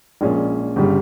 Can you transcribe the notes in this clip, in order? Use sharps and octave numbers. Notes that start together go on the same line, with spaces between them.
A#1 A#2 G#3 C#4
G1 C#3 G3